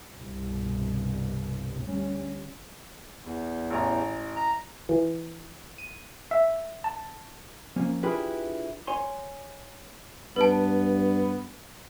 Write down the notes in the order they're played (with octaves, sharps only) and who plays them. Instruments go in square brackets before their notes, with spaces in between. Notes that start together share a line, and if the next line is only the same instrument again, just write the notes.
[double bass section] C2 G2 B2
D2 G3 C#4
[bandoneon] E2
[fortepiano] A1 C#5 A#5
[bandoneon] A#5
[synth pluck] E3
D#7
E5
A5
[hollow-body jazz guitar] F3 A#3 C#4
D4 E4 F4 G4 G#4 B4
C#5 G#5 C6
[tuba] G2 [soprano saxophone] B3 [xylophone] B4 A5